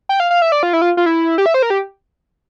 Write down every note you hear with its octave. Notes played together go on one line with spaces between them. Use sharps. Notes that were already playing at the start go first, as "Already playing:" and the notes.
G5
F5
F5
E5
D5
F4
E4
F4
F4
E4
G4
E5
C5
A#4
G4